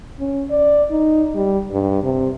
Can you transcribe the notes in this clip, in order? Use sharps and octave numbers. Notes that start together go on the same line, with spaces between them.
C#4
D5
D#4
G3
G2
C3